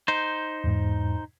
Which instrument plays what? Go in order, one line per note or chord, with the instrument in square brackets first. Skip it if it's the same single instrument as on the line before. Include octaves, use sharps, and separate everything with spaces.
[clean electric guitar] D#4 C5
[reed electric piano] E2 G#2